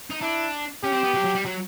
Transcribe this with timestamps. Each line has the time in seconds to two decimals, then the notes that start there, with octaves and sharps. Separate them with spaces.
0.11 D#4
0.21 D4 E4
0.83 C#4 G4
0.93 C4
1.03 B3
1.14 F#3
1.24 F#3
1.35 G3
1.45 F#3